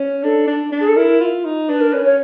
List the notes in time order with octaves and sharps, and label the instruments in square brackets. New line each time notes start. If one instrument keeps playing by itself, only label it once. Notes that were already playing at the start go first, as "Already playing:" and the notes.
Already playing: [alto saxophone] C#4
[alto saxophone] D4 [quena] A4
[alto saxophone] D4
D4
[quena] G#4
A4
[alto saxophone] E4 [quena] A#4
[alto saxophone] F4
D#4
[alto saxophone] D4 [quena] B4
[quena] A#4
[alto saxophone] C#4 [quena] B4
[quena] C#5